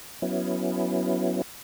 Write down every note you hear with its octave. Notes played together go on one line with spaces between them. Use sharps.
F#3 B3 C#4 E4